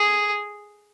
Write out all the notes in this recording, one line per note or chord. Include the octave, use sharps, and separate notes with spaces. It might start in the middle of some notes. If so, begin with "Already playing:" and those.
Already playing: G#4